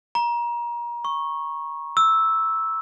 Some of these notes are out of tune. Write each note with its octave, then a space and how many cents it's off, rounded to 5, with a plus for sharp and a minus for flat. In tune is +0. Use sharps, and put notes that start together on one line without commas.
A#5 +30
C#6 -10
E6 -5